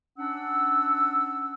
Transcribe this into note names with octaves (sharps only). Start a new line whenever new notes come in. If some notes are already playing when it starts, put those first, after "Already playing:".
C#4 D4 F#5 E6